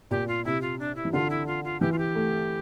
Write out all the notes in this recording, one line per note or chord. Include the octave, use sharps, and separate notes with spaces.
A#2 G4
F4
C3 E4
F4
D4
E4
E3
D3 F4
E4
F4
F4
E3 G4
F4
G4
A3